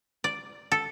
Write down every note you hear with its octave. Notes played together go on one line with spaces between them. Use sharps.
D5
A4